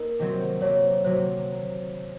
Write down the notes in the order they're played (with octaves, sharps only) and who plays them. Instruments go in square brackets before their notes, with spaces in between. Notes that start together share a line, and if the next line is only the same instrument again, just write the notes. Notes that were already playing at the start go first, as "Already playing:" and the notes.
Already playing: [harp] A#3 D#4 [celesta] A#4
[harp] C3 D#3 F#3 C4
[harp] C3 F#3 A#3 [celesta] C#5
[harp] C3 F#3 A#3 [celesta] C5